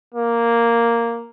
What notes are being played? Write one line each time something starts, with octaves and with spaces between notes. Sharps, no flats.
A#3